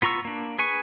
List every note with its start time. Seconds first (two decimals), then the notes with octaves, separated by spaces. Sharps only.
0.02 B3 F4 A#5 C#6 E6
0.25 A#3 D4
0.58 G#4 B4 G#5 C#6